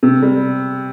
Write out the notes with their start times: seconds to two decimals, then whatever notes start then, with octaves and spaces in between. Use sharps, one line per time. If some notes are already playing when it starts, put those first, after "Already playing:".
0.03 C3
0.22 G3